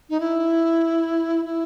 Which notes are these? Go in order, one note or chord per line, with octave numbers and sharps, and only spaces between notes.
D#4
E4
E4